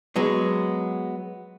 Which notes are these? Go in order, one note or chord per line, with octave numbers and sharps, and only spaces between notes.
F#3 G#3 B3